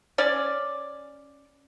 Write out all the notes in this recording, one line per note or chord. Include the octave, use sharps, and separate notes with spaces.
C#4 D5